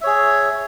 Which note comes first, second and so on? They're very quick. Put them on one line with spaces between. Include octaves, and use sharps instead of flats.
E5 C#5 G#4